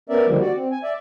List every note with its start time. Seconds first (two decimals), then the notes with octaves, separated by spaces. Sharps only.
0.09 B3 C#4 A#4 D5 E5
0.27 D3 D#3 F3 G3 A#3
0.40 F#4 D5
0.55 C4
0.71 G#5
0.83 D5 E5